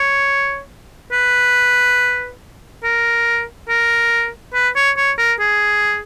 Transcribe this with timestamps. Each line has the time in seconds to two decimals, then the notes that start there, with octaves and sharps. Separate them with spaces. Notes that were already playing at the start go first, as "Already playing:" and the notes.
Already playing: C#5
1.12 B4
2.84 A#4
3.69 A#4
4.54 B4
4.76 C#5
4.97 C#5
5.18 A#4
5.40 G#4